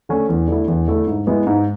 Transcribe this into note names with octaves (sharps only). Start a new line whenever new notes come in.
D3 A3 C#4
E2
D3 A3 E4
E2
D3 A3 E4
G#2
G#3 B3 E4
G#2